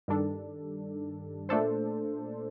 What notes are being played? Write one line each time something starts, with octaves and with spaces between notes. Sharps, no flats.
G2 D#3 G3 D4 A4
A#2 A3 D4 A4 C5